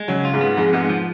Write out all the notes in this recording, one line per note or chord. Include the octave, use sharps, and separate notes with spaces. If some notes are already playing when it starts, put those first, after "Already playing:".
Already playing: G#3
C#3 F#3
F4
G#2 G#3
B3
F2 G#2 G#3
G#2 G#3 B3
F3